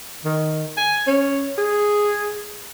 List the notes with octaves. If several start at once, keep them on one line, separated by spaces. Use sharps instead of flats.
D#3
G#5
C#4
G#4